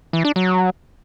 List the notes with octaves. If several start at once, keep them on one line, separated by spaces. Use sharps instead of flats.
E3
D4
F#3